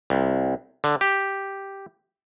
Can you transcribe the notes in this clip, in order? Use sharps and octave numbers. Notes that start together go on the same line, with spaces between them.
C2
D3
G4